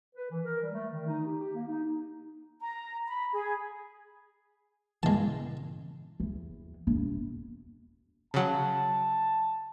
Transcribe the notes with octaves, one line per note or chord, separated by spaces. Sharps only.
B4
E3
A#4
G3
A3
D#3
D#4
G4
G4
A#3
D#4
A#5
B5
G#4
A#2 C#3 E3 G#3 A5
E2
E1
C#3 F#3 A5